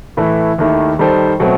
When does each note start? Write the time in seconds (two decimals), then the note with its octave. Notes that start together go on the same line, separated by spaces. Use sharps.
0.17 A2 E3 A3 E4
0.59 D#2 D#3 A3 E4
0.99 D#3 G3 D#4 A4 C5
1.40 B2 F#3 A3 C4